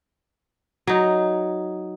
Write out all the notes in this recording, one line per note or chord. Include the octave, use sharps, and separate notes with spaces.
F#3 D#4